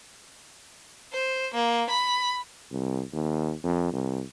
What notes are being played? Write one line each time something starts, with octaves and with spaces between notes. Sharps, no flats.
C5
A#3
B5
C2
D#2
F2
C2